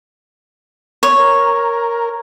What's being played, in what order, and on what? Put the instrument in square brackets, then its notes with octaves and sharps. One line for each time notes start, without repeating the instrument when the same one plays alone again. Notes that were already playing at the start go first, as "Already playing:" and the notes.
[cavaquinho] C#5
[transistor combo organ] A#4